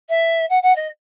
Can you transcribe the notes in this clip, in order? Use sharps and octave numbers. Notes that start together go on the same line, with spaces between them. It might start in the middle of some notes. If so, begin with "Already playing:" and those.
E5
F#5
F#5
D#5